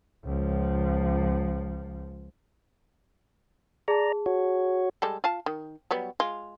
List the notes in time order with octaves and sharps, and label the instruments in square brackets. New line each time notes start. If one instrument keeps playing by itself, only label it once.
[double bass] C#2 F3
[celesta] G#4 A5 [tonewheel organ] D5 A#5
[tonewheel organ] F#4 C#5
[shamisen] G3 G#3 A4
F4 F5 A5
D#3
F#3 G3 B3
G#3 F4